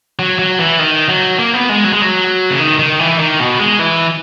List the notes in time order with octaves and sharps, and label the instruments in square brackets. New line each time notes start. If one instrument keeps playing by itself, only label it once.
[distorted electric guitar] F#3
F#3
E3
D#3
F#3
A#3
B3
G#3
F#3
G#3
F#3
C#3
D#3
D#3
E3
D#3
B2
G#3
E3